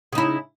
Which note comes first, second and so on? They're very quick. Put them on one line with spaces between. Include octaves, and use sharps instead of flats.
C#3 D#4 E4